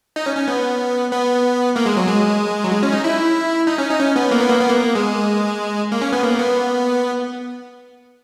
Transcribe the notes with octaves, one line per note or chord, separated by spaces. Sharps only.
D#4
C#4
C#4
B3
B3
A#3
G#3
F#3
G#3
F#3
G#3
C#4
D#4
E4
D#4
C#4
D#4
C#4
B3
A#3
B3
A#3
B3
A#3
G#3
A#3
C#4
B3
A#3
B3